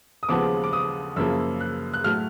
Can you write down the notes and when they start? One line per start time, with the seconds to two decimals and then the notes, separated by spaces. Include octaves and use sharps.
0.23 D#6
0.29 D#2 C#3 F3 G#3 B3 D6
0.64 D6
0.73 D#6
1.16 F#2 C#3 F3 A#3 E6
1.60 F#6
1.94 F#6
2.04 A2 F#3 A3 F6